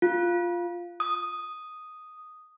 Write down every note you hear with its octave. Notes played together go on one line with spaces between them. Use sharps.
F4
D#6